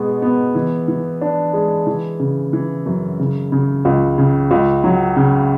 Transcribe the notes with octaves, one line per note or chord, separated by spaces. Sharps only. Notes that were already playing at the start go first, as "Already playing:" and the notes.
Already playing: B2 G#3 B3
B3
E3
E3
D4
G#3
E3
C#3
E3
F#2
C#3
C#3
C#2
C#3
C#2
F#3
C#3